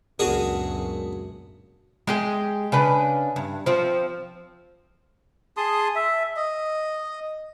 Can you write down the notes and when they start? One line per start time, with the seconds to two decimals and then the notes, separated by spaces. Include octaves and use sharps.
0.19 C#2 F#2 A#2 B3 D4 F#4 G#4 A#4
2.07 G#3 G4 G#4
2.72 C#3 D4 B4
3.36 G2
3.66 F3 C4
5.57 G#4 A5 C6 D#6
5.95 E5
6.36 D#5